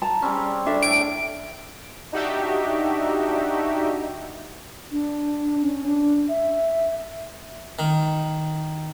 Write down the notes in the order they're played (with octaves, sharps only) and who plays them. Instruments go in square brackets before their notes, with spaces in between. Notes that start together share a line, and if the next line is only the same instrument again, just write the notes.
[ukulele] A5 A#5
[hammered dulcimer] G3 C4 C#4
[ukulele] D4 A4 E5
[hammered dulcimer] A2 G#5 [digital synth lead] D7
[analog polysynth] D4 D#4 F#4 G4 E5
[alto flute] D4
C#4
D4
E5
[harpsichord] D#3